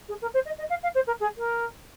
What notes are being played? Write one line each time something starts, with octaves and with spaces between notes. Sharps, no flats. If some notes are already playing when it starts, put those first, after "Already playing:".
G#4
A#4
C5
D#5
D#5
F5
F5
C5
A#4
G#4
A#4